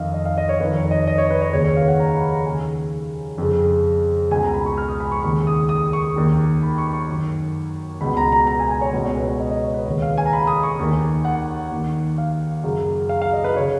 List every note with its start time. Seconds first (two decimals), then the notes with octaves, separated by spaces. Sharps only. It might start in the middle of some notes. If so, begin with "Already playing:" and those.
Already playing: F2 D#3 D#5 F5
0.14 D#5
0.25 F5
0.38 D#5
0.49 C#5
0.60 F2 D#3 B4
0.76 C#5
0.91 D#5
1.07 D#5
1.18 C#5
1.30 B4
1.41 C#5
1.53 D#2 C#3 C#5
1.64 C#5
1.77 F5
1.88 F#5
1.99 A#5
2.15 B5
2.31 A#5
2.45 D#2 C#3 G#5
3.38 F2 C#3
4.31 C#2 B2 G#5
4.42 A#5
4.53 B5
4.66 C#6
4.78 F6
4.88 D#6
5.00 B5
5.12 C#6
5.23 D#2 C#3 C#6
5.47 D#6
5.69 D#6
5.93 C#6
6.16 D#2 D#3
6.63 B5
6.78 C#6
6.93 C#6
7.09 F#2 D#3
8.01 C#2 B2 B5
8.17 A#5
8.32 A#5
8.47 A#5
8.59 G#5
8.71 G#5
8.81 C#5
8.93 C#2 B2 B4
9.05 C#5
9.17 B4
9.28 C#5
9.40 D#5
9.51 D#5
9.64 C#5
9.74 B4
9.86 D#2 C#3 C#5
10.02 F5
10.18 G#5
10.26 A#5
10.33 B5
10.47 D#6
10.63 C#6
10.79 D#2 D#3
11.25 F#5
11.72 D#2 D#3
12.18 F5
12.64 F#2 C#3
13.09 F5
13.22 F5
13.33 D#5
13.44 B4
13.56 C#3 C#5